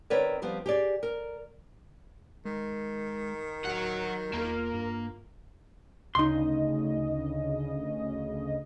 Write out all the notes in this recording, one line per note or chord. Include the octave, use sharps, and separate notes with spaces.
D#3 C4 A#4 B4 C#5 D5
F3 G3 B3 C4
G4 G#4 D5
A#4
D#3 G#3
D1 F#3 C#5 F#5
E2 A#3 F4 A#4
G2
D2 C#3 D#4 D#5 C6